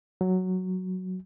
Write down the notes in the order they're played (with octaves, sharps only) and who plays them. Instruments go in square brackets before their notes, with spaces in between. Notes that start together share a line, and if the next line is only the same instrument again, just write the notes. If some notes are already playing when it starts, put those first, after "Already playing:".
[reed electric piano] F#3